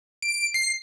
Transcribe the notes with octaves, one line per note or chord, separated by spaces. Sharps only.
D7
C7